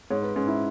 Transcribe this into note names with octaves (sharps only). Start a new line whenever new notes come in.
G#2 C#5
B4
G#2 C#4
E4